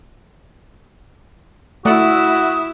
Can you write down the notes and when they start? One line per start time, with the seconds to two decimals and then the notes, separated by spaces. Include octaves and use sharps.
1.85 A3 E4 F#4 D5 E5 F#5 D#6 E6